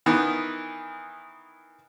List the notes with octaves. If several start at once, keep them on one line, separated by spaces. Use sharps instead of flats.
D#3 E3 B3